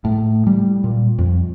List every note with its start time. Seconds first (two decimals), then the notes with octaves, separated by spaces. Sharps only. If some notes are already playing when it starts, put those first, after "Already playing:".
0.05 A2
0.47 G3
0.84 A#2
1.19 F2